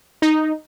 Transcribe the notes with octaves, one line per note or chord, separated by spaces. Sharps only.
D#4